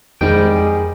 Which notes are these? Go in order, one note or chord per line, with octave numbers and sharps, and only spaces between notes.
F2 G#2 D#3 G3 G#3 G5
G#4